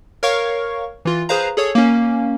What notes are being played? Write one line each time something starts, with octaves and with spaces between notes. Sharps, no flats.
A#4 C#5 F5 C#6
E3 F4
G#4 B4 C5 F5 A#5
G#4 A4 C#5
A#3 C#4